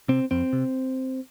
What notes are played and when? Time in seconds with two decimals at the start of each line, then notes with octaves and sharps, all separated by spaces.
0.08 C3 C4
0.31 F2 C4
0.53 C3